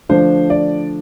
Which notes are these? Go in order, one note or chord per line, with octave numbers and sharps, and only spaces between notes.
D3 F3 A3 D4 C5
D5